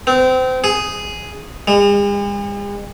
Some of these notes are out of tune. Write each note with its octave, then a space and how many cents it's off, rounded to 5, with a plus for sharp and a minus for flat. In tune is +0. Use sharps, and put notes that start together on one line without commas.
C4 -25
G#4 +0
G#3 -45